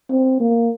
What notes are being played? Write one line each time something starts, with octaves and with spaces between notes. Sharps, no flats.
C4
A#3